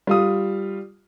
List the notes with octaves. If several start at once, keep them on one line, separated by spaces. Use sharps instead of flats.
G3 F4 D#6